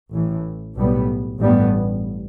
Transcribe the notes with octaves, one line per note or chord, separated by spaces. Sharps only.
A1 A2 E3
B1 A2 G3 B3
A1 G2 G3 B3